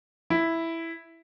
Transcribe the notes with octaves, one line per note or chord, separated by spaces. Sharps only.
E4